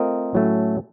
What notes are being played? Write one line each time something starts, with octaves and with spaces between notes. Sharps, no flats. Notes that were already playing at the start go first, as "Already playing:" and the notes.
Already playing: A3 C4 F4 A#4 D#5
A2 F#3 A3 C#4